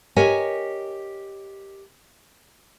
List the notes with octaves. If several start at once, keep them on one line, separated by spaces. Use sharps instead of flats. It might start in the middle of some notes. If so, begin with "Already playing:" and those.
G4 A#4 C#5 D#5 G#5